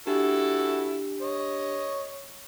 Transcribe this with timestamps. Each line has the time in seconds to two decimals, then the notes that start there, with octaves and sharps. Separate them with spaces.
0.07 D4 E4 F#4 G4 A4
1.22 C#5 D#5